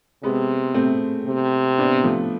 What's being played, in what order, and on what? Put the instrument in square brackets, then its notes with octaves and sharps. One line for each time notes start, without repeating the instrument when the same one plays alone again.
[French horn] C3 [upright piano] G#3 B3
[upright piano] A3 C4
[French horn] C3
[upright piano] B3 D4
F3 A3